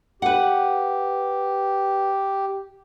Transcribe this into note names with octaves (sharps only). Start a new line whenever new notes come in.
G4 B4 F#5